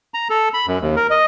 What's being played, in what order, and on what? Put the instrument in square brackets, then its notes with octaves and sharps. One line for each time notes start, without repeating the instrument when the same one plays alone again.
[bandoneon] A#5
A4
B5
F#2
D#2
A#4
D#5